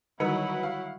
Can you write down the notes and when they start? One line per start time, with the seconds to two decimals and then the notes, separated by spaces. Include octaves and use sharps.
0.20 D3 D#3 F#3 G3 D#4 E4 B4 F#5
0.63 F5